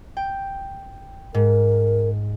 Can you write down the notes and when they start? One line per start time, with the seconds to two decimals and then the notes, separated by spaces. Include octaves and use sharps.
0.17 G5
1.34 G#2 A#4